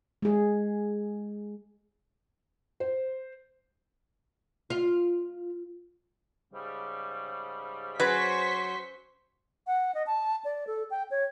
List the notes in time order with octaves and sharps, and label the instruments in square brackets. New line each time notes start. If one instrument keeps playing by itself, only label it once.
[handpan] G#3 G#4
[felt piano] C5
[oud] F4
[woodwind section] G#2 C#3 G3
[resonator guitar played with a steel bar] F#3 [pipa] C#4 G#4 B4 [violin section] C5 C#6 B6 [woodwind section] C6
[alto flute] F#5
D#5
A5
D5
A4
G5
C#5